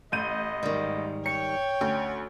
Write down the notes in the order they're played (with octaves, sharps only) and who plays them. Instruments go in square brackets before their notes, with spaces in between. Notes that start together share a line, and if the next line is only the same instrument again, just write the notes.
[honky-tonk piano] A1 G6 D#7 [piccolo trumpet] D#5
[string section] G#2 [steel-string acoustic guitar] D#3 G3
[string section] C#5 [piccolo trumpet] G5 [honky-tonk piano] C#7
[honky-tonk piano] D2 [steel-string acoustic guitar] C#4